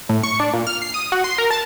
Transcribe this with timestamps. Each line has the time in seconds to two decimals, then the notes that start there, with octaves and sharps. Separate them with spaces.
0.09 A2
0.23 C#6
0.40 D4
0.53 A#2
0.67 F6
0.82 C7
0.94 D#6
1.12 F#4
1.24 C6
1.38 A#4
1.51 A5